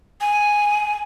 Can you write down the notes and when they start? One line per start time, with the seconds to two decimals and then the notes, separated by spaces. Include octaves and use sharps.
0.21 G#5